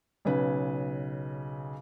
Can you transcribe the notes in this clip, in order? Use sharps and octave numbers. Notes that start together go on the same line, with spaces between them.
B1 C#3 B4